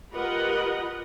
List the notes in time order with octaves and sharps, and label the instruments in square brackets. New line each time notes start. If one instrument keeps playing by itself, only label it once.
[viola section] F4 G4 A#4 B4 D#5 F#5